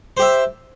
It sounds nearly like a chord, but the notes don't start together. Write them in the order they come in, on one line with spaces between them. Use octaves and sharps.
C5 G4 E5